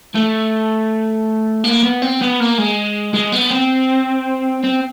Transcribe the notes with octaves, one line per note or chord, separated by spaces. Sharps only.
A3
A#3
B3
C4
B3
A#3
G#3
G#3
B3
C4
C4